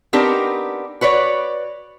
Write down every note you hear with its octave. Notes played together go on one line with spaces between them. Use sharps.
B3 C4 D4 D#4 G4 A#4
F#4 B4 C#5 D5